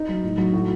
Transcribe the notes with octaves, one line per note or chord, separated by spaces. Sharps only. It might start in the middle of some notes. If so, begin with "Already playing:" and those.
Already playing: D#4
F#3
A2
F#3
A2 F#4